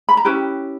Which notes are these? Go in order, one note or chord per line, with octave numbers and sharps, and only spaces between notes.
B5
A#5
C#4 E4 G4 B4 G5